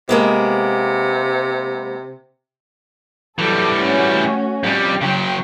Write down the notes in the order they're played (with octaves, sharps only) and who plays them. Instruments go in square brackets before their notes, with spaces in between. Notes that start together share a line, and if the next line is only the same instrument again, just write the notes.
[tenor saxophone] C3 [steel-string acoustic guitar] G#3 A#3 B3
[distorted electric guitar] E3 G3 [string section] F#3 A4
[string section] A3 C#4 F#4
[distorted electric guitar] F2 G3
[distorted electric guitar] C#3 F#3 [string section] G5